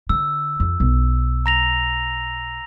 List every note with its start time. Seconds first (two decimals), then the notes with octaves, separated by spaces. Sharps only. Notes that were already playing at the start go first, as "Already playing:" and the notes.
0.09 D3 E6
0.60 F2
0.80 B1
1.46 A#5 A#6 F7